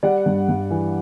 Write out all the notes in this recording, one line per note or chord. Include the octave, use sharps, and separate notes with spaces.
G3 D5 F#5
G2
G2
E3